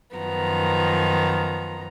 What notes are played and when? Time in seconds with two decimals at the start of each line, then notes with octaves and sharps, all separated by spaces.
0.15 F#2 D#3 F3 B3 A#5